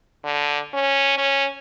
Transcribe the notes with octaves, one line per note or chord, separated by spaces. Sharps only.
D3
C#4
C#4